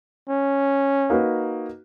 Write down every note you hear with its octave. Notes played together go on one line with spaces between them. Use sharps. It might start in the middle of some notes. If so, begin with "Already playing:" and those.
C#4
A#3 D#4 F#4 B4